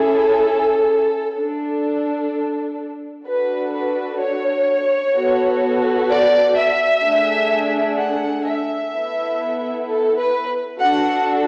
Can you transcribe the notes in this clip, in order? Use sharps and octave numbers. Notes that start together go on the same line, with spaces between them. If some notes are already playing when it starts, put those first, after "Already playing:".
Already playing: C#4 E4 G#4 A4
D4 A4
D4 F#4 A4 B4
B4
C#5
B3 F#4 A4
D5
E5
A3 D4 G#4
F#5
E5
B3 E4 A4
A4
B4
D4 F#4 A4 F#5